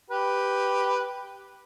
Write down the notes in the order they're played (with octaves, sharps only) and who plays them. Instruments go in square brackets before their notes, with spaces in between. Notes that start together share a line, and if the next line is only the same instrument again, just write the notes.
[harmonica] G4 B4